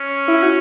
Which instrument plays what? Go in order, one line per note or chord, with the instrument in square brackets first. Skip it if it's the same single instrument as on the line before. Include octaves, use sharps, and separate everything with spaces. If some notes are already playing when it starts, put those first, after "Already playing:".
Already playing: [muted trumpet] C#4
[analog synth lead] E4
F#4